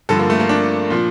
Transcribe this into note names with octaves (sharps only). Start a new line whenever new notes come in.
G2 D3 F3 A4
A#3
A3
A#3
D4
A#2 F3